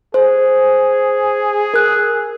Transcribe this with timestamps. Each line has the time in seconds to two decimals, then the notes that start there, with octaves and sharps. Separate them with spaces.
0.14 G#4 C5
1.74 A#4 F#6